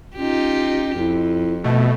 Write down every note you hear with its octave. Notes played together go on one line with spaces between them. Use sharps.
C#4 D#4 F4 G4
F2 E4
B2 A3 D#5